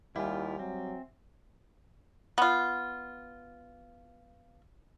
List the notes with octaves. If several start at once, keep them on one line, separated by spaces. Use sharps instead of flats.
D#2 G3 E4 F4 E5 F#5 G#5
F#3 C4
B3 F4